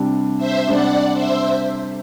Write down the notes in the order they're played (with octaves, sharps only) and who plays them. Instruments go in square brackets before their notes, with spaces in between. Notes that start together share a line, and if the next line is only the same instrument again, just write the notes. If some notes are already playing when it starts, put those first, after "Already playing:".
Already playing: [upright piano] C3 G3 D4
[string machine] C5 E5
[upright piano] C3 G3 D4 [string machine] D5 F#5
[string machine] C5 E5